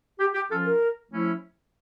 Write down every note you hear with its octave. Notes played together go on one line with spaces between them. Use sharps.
G4
G4
F3 C#4 F4 A4
A#4
F3 A3 C#4 E4